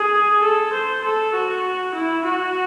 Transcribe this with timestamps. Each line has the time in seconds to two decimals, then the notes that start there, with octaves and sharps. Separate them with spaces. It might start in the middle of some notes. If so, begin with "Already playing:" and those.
Already playing: G#4
0.43 A4
0.73 C5
1.04 A4
1.34 F#4
1.94 E4
2.25 F#4